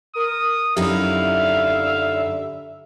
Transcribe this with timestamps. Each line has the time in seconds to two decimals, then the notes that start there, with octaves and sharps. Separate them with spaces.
0.16 A#4 D#6
0.77 F#2 D3 D#4 E4 G4 E5 F5